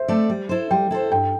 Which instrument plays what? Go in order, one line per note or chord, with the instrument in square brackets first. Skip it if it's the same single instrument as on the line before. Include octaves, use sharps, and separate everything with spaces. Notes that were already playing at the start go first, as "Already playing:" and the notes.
Already playing: [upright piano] C5 E5
[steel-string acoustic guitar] A3 C4 A4 D5
G3
E4 A4 C5
[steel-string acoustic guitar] G3 [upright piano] G5
[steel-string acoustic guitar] E4 A4 C5
[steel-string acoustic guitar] G2 [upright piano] G5